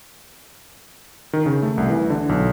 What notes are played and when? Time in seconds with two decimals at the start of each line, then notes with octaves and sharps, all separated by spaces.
1.33 D#3
1.46 C#3
1.62 A3
1.78 C2
1.90 E3
2.10 D3
2.29 B1